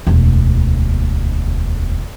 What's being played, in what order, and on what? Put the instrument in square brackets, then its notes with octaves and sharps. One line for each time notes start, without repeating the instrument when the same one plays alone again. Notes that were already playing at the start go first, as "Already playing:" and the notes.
[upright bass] E1 D2